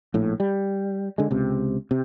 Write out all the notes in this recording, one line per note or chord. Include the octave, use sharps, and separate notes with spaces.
A#1 A2
G3
D3 G#3
C#2 C3
C3